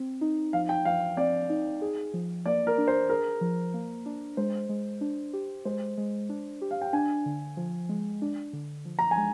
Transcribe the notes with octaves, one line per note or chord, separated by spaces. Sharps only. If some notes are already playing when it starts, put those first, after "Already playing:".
Already playing: C4
D#4
F3 F5
G5
F3 F5
C4 D5
D#4
G#4
F3
A#3 D5
A#4
D4
C5
G#4 A#4
F3
A#3
D4
G#3 C5
G#3
D4
G4
G#3 C5
G#3
D4
G4
F5
G5
D4 G#5
D3
F3
G#3
D4
D3
F3
A#5
G#5
G#3